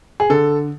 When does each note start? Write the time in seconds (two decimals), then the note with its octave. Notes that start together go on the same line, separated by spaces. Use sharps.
0.20 G#4
0.30 D3 A4